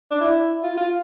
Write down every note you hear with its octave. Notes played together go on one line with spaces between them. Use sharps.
D4
E4
F4
F4